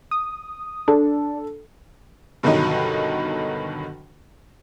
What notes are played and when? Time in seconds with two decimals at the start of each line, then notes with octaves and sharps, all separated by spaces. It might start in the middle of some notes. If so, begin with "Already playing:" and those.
0.11 D#6
0.88 D4 A4
2.43 G2 B2 D3 D#3 F#3 D#4